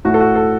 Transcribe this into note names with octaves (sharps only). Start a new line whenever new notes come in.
A2 A3 F#4
A4
F#4
A4